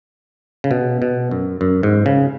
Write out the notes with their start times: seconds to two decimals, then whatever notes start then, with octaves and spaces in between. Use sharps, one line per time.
0.64 C#3
0.71 B2
1.02 B2
1.31 F#2
1.61 F#2
1.83 G#2
2.06 C#3